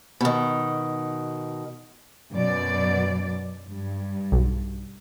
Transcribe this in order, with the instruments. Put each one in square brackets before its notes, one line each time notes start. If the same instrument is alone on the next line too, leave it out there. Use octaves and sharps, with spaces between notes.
[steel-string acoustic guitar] B2 D#3
[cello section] F#2 B2 D5
G2
[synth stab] B1